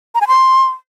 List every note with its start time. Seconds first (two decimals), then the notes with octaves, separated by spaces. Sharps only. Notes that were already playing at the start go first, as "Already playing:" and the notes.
0.15 A#5
0.21 G#5
0.27 C6